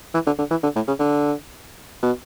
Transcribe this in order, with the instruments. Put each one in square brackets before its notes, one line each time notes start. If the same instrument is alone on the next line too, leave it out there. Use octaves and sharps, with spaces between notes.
[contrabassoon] E3
D3
D3
E3
D3
A2
C#3
D3
B2